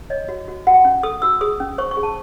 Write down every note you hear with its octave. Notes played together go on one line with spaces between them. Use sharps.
C#5 D#5
F#4
F#4
F#4 F#5
C#4
A4 D#6
F#4 E6
G#4 D#6
C#4
C5 C#6
C#6
G#4
A5